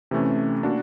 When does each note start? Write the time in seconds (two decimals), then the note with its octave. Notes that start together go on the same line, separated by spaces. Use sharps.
0.11 C3 E3 A3 C#4
0.63 A#3 D4 F#4